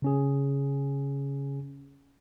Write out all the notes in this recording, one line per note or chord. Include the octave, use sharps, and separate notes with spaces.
C#3 C#4 G#4